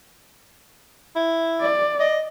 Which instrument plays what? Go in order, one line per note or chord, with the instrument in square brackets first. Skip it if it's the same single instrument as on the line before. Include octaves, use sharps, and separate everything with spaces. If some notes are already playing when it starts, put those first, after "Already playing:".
[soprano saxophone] E4
[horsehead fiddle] D5
[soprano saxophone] D#5